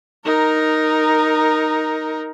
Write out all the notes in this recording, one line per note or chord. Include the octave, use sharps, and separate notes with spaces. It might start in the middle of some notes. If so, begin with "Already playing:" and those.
D#4 A#4